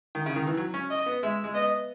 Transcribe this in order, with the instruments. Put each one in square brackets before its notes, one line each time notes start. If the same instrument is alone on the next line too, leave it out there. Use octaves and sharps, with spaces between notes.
[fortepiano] D#3
C#3
D#3
E3
F#3
C#4
[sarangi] D#5
[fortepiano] B3
[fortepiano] G#3 [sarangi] E5
[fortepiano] G#3
[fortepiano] B3 [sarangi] D#5